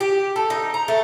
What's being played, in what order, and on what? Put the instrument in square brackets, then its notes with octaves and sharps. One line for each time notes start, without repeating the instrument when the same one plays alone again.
[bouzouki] G4
A4
D#4
A#5
A3